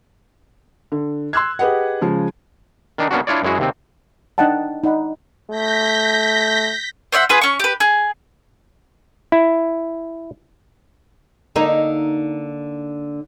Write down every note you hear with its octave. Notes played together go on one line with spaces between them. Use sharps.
D3
C6 E6 F#6 G#6
G4 G#4 B4 D#5 F#5
C#3 F3 G#3
D#3 D4 D#4
A#3 B3 C#4 D4 F#4
D4 E4 F4 C#5 D5
F#2 G#3 E4 F#4 G#4
D#2 C3 C4
D4 D#4 D#5 F#5 G5 A5
D#4 D5 F#5 B5
A3 G6 A#6 B6
C5 C#5 E5 F#5
F4 G#4 B4
C#4 C#6
G4 B4
G#4
E4
D3 A#3 D#4